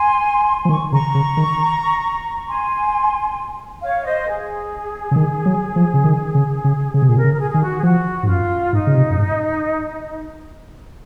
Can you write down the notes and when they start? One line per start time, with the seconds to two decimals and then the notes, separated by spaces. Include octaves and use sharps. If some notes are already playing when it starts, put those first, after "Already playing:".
Already playing: G#5 C6
0.65 F3
0.69 D#3 C#6
0.92 C#3 A#5 C#6
1.14 C#3
1.37 D#3
2.48 G#5 C6
3.82 C#5 F5
4.04 C5 D#5
4.27 G#4
5.11 C#3
5.16 D#3
5.46 F#3
5.76 F3
5.94 C#3
6.04 D#3
6.35 C#3
6.64 C#3
6.94 C#3 G#4
7.02 C3
7.06 A#2 G#4
7.16 C3 A#4
7.24 C#3
7.33 A#4
7.39 G#4
7.50 D#3 G#4
7.61 F#4
7.79 G#4
7.83 F3 F#4
8.23 G#2
8.27 F#2 F4
8.73 G#2 D#4
8.87 C#3
8.95 C3
9.10 F#2
9.17 G#2